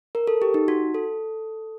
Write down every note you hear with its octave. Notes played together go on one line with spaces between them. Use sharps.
A#4
A4
G4
D#4
F#4
A4